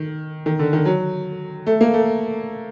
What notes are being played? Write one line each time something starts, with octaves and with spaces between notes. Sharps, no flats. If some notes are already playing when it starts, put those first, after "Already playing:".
Already playing: D#3
D#3
D3
D#3
F#3
A3
A#3
A3